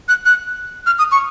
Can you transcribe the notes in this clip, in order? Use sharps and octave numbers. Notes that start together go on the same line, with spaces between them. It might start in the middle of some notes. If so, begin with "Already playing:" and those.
F#6
F#6
F6
D#6
C#6